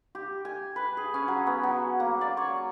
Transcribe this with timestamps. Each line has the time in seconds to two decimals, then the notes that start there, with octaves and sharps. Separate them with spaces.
0.15 G4
0.45 G#5
0.76 B4
0.97 G#4
1.14 C#4
1.28 F#3
1.47 B3
1.63 F#3
2.00 A#3
2.21 D5
2.37 C#5